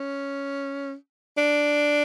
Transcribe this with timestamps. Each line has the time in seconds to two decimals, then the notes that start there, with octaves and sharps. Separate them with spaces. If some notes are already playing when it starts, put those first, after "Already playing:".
Already playing: C#4
1.38 D4